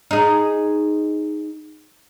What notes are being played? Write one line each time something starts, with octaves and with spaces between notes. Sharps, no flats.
D#4 G#4